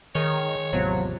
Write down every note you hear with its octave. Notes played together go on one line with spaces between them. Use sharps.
D#3 G#3 C#5
A1 E2 C3 F3 F#3